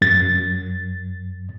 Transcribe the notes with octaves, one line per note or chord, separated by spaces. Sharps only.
F#2 A6